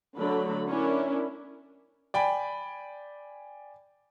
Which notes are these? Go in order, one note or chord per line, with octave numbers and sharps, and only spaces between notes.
D3 F#3 A3 A4 B5
C#4 D4 E4 A#4
D5 G5 G#5 B5